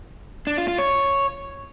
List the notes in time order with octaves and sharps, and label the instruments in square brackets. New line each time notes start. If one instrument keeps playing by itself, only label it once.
[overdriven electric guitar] D4
F4
F4
C#5